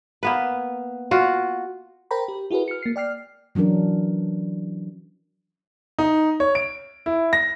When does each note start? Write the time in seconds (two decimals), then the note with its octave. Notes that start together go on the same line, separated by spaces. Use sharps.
0.23 A#3 B3 B4
1.11 F4 F#4
2.11 A#4 C5 G5 A#5 B5
2.28 G4
2.51 E4 F#4 G#4 A#4 B4
2.68 F6 C#7
2.82 A#3 C7
2.96 D5 G5 F6 C7
3.55 E3 F#3 C#4 D4 A#4
5.99 D#4
6.40 C#5
6.55 D7
7.06 E4
7.33 A#6